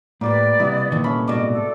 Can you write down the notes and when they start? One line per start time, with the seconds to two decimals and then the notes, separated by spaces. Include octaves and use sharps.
0.21 A2 A#3 G4 B4 D5
0.60 B1 C3 G3 E4 D#5 F#5
0.92 E2 A#2 D#3
1.04 C2 A3 C#4 B5
1.28 C2 G#2 B2 F#4 D5 D#5
1.53 A4